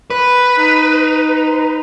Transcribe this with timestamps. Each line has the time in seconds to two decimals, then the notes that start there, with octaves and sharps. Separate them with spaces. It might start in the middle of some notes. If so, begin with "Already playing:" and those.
0.10 B4
0.57 D#4